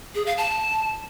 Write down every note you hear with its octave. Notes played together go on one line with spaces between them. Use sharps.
G#4
F5
A5